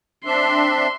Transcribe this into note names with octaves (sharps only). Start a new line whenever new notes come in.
C4 D4 E5 C6